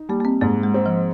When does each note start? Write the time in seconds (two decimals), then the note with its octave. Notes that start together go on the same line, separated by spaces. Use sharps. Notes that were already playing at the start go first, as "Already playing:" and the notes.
Already playing: D#4
0.09 G3 A#3
0.20 A#3
0.25 C4
0.41 G#2 A#3
0.63 G#3
0.74 C4
0.86 F3